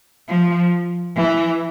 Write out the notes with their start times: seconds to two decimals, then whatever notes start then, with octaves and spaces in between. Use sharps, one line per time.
0.28 F3
1.16 E3